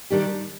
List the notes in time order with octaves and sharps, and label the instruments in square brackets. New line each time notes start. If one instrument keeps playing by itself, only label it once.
[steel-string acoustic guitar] D#3 G3 D4 G4